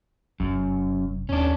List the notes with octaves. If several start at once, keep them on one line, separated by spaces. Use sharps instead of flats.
F1 F#2
D#2 C#4 D4